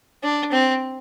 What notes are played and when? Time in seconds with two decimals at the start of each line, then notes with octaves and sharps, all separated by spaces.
0.23 D4
0.52 C4